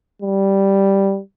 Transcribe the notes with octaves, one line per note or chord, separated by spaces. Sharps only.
G3